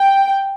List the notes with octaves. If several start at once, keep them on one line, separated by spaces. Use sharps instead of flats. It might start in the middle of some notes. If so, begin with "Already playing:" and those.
Already playing: G5